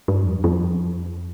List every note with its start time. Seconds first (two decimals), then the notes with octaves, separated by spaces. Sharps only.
0.08 G2
0.26 F2
0.44 F2